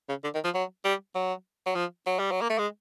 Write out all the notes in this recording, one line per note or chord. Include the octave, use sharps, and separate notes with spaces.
C#3
D3
D#3
F3
F#3
G3
F#3
F#3
F3
F#3
G3
F#3
A#3
A3
G#3